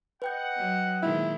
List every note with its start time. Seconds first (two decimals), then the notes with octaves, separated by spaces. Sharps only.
0.22 B4 D#5 F#5 G5 G6
0.57 F#3
1.03 A#2 D#3 G#3 E4